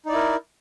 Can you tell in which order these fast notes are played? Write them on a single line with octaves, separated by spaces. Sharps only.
D#4 D5 E4 A#4